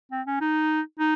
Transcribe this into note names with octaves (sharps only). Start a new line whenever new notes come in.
C4
C#4
D#4
D#4